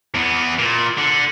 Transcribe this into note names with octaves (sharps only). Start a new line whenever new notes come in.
E2 B3
A#2
D3